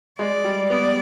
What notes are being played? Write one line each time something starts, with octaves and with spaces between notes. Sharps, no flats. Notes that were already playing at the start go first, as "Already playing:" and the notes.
G#3 D5
G3
B3 D5